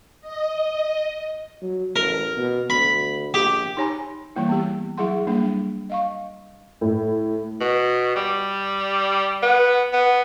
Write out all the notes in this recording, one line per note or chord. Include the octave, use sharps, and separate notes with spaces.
D#5
F#3
A1 A#4
B2
D2 B5
A#1 G4
D#4 G4 C#5 G#5 A#5 B5
E3 G3 A#3 E4
B3 G4
F#3 E4 G#4 F#5 C6
G3 A#3 D4
D#5 F5 C#6
A2
B2
G3
B3
B3